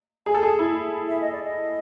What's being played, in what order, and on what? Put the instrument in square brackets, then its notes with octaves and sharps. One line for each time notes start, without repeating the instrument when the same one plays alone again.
[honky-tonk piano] G#4 [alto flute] G#5
[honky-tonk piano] A4
[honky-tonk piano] G#4 [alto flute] A5
[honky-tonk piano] E4
[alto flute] E5
D#5
D5
D#5